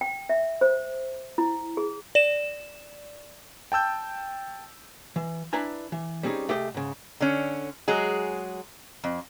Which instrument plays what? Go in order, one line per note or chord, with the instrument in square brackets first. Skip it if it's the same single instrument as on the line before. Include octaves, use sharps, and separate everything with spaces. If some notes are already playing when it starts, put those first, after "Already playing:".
[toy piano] G5
E5
C5
E4
G#4
[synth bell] D5 E7
[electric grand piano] G5 A5 E6 G6
[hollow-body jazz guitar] E3
D4 E4 B4 G#5 A#5
E3
G3 C4 C#4 D#4 G#4
C2 A3 G4 G#4 C5 D#5
G#2 C#3
[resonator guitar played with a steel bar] D3 C#4
F#3 G#3 G#4
F2